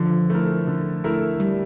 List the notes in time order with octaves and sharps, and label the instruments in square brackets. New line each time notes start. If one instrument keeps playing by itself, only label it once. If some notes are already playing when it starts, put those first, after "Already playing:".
Already playing: [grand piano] D3 [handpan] F3
[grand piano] A3 E4 A#4
D3
A3 E4 A#4
[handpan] G3